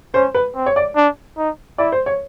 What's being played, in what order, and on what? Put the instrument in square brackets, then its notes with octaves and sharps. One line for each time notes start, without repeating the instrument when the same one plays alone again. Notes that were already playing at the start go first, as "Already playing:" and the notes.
[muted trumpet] C#4 [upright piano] C5
[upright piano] B4
[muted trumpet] C4
[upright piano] C#5
D5
[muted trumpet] D4
D#4
[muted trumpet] E4 [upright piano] D5
[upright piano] C5
C#5